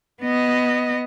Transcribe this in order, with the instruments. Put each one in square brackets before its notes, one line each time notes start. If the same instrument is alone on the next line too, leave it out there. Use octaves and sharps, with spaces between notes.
[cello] B3 D#5